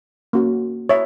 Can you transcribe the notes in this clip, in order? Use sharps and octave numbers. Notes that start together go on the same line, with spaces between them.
A#3 C#4 F#4
C#5 E5